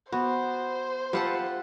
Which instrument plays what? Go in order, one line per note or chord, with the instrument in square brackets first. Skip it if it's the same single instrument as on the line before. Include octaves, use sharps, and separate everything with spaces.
[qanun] B3 [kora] F#4 [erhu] C5
[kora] F4 G4 A4 [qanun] B4 F#5 A5